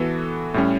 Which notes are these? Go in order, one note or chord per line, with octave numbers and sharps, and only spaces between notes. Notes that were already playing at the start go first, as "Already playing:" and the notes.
Already playing: E3 B3 F#4 A4
A2 G3 C#4